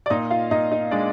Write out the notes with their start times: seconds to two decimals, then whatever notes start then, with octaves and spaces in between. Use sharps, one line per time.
0.06 D5
0.10 A#2 D#4 D#5
0.31 F4 F5
0.51 A#2 D#4 D#5
0.71 D#4 D#5
0.91 G#3 D4 D5